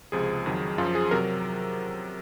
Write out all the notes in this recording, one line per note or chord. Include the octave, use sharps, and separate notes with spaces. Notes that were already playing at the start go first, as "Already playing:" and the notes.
C#2 C3 F3 G#4
F2 D#3 F#3
F#2 F3 F4
G#4
C3 F#3 A#4